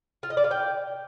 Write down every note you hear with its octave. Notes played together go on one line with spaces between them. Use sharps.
F4
D#5
D5
F4
G5